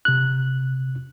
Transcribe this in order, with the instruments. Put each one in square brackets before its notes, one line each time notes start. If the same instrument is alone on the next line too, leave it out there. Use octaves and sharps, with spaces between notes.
[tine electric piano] C3 F#6